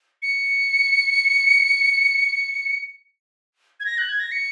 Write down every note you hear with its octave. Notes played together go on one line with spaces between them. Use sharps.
C#7
G#6
A#6
F#6
G#6
A#6
C#7